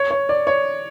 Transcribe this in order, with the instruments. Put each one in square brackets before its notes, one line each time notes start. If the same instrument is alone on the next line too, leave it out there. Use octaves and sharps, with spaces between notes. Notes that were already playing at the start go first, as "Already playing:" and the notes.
Already playing: [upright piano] C#5
C#5
D5
C#5